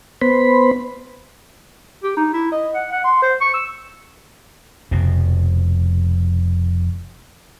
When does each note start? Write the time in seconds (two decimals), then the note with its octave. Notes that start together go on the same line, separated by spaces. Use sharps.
0.21 B3 C5 B5
2.03 G4
2.17 D#4
2.33 E4
2.52 D#5
2.75 F#5
2.92 F#5
3.04 C6
3.22 C5
3.41 C#6
3.54 E6
4.91 F1 F2 B2